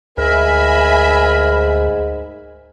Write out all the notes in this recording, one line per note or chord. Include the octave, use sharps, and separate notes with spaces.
D2 G#2 A#4 E5 G#5 B5